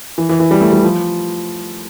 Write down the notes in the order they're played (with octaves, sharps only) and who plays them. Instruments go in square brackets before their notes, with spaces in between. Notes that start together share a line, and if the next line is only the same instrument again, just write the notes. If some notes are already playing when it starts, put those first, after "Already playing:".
[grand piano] E3
E3
E3
G3
A3
G3
F3